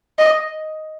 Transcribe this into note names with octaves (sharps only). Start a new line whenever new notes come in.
D#5